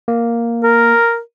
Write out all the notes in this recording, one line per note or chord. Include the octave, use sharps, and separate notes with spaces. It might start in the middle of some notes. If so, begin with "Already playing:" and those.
A#3
A#4